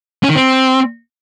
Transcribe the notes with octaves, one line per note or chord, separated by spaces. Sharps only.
C#4
D#3
C4